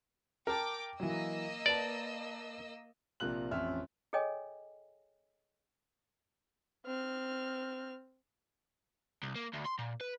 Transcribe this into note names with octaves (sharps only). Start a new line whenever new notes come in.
A#4 G5 A5 D6
E3 F#3 A#3 D#5 E6
B4 D5 A5
A#1 C3 A#3 F4 F#6 F#7
A1 F2 C#4 E5 F6
G#4 A4 C#5 D#5 G5 G#5
C4 F6
C2
A#3
D2
C6
A#2
B4